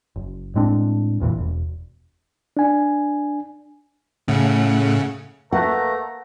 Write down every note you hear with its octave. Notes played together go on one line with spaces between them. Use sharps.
F#1
A2 G#3 C4 D4
G#1 F2 A#2 E3
E1
D4 G#5
A2 C#3 A3 F#5
A3 A#3 B4 F#5 A#5